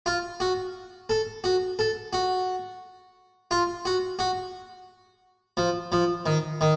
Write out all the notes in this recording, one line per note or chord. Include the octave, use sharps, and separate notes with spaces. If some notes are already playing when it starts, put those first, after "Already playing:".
F4
F#4
A4
F#4
A4
F#4
F4
F#4
F#4
F3
F3
D#3
D#3